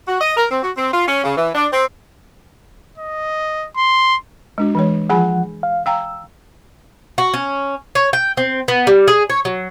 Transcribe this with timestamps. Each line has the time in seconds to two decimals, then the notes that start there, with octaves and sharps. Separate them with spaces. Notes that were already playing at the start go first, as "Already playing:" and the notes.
0.08 F#4
0.20 D#5
0.36 A#4
0.49 C4
0.62 F#4
0.75 C4
0.92 F4
1.06 C#4
1.24 C#3
1.36 E3
1.54 D4
1.72 C4
2.98 D#5
3.77 C6
4.58 G#3 D4 F#4
4.75 E3 G#3 C#5
5.10 F3 G#4 F#5 G#5 B5
5.63 F5
5.86 F5 G5 A#5 E6
7.18 F#4
7.34 C#4
7.95 C#5
8.13 G5
8.37 C4
8.68 B3
8.87 G3
9.08 G#4
9.30 C#5
9.45 F#3